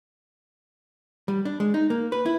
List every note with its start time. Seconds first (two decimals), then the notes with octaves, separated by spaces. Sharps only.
1.28 G3
1.45 D4
1.60 G#3
1.74 D#4
1.90 A#3
2.12 B4
2.26 E4